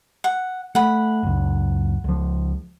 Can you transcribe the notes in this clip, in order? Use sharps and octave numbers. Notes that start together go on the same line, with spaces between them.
F#5
A3 F#5 B5
F#1 C#2
C#2 F3